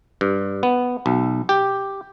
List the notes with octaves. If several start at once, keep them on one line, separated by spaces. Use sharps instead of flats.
G2
B3
B1
G4